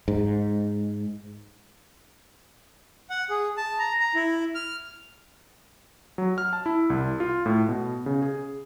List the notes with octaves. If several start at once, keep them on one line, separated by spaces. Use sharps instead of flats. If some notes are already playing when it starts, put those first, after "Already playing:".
G#2
F#5
G#4
A5
A#5
A#5
E4
F6
F#3
F6
A5
E4
C2
F4
A2
B2
C#3
G#4